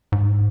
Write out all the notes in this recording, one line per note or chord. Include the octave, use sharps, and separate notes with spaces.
G#2